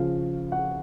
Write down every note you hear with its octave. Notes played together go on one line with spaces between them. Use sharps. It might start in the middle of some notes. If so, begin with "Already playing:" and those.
Already playing: C#3 F3 F5
F#5